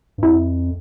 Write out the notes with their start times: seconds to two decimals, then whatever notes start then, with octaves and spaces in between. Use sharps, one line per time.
0.18 G2
0.23 F2 E4